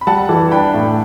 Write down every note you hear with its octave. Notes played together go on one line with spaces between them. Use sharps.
B5
G3 F#5 A5
E3
D4 G5 B5
A2